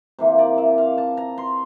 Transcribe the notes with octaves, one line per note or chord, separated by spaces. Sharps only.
C3 E3 A#3
D5
E5
F5
A5
A#5
C6